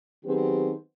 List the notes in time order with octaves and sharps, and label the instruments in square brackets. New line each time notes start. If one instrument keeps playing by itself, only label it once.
[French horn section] D#3 F#3 B3 C4 G4 G#4